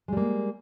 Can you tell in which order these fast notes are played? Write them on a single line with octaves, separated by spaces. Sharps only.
G#3 G3 A#3